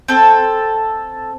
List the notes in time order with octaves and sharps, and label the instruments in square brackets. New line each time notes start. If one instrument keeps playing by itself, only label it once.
[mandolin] C4 A4